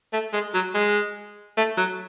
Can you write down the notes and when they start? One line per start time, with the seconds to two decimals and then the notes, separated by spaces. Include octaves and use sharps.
0.13 A3
0.33 G#3
0.54 F#3
0.74 G#3
1.57 A3
1.77 F#3